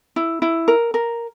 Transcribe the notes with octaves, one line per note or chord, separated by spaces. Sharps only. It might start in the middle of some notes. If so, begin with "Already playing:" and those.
E4
E4
A#4
A#4